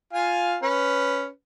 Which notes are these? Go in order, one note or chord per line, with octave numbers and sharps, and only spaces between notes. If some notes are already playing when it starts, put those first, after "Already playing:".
F4 F5 G#5
C#4 B4